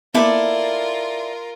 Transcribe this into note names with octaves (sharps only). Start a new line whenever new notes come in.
A#3 B3 E4 F4 A4 A#4 D5